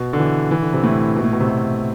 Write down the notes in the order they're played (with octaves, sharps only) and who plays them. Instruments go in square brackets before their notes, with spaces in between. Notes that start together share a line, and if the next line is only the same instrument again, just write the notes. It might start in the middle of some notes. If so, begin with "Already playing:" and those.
Already playing: [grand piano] B2
D3
E3
E3
D3
C3
A2
B2
A2
B2
C3
B2